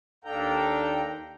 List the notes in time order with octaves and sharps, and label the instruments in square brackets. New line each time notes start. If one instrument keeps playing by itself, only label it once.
[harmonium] D#2 G5 A#5 [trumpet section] D4 A4 F5